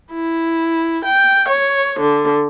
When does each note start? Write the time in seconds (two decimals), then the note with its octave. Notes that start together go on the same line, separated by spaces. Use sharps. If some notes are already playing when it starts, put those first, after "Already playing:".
0.13 E4
1.05 G5
1.48 C#5
2.01 D3